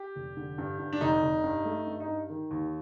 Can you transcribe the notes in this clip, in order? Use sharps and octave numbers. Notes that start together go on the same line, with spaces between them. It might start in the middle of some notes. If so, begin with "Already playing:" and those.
Already playing: G4
F1
D3
G2
G2
D4
F1 D#4
F1
G2
A3
G2
D#4
G2
D#3
D#2